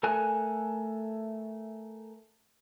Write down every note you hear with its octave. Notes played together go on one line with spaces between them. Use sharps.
A3 A4 A#4 G#5 F#6